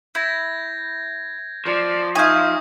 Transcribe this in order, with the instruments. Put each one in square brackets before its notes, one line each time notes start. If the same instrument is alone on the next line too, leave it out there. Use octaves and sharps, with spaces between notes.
[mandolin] E4 [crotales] G6 G#6 A#6
[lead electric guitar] F3 [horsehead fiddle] D5
[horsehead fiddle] D#4 E5 [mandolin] F5 G#5 [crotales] C#6 D#6 G6